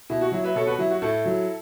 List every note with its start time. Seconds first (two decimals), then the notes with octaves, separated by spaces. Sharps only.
0.10 B2 E4
0.21 F#4
0.32 F#3 E4
0.44 B4 E5
0.55 B2 A4 C#5
0.67 F#4 B4
0.79 F#3 E4
0.91 F#4
1.02 A2 E4 A4
1.26 F#3